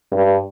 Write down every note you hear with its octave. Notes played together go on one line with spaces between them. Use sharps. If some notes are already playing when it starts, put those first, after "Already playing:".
G2